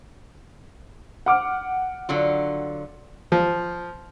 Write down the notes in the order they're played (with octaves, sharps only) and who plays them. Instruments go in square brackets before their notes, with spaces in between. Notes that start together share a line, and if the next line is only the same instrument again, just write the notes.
[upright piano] F#5 D6 F6
[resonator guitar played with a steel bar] D3 F#3 F4
[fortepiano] F3